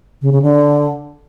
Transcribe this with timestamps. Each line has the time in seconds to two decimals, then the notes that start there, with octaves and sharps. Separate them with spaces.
0.22 C#3
0.32 C#3
0.42 D3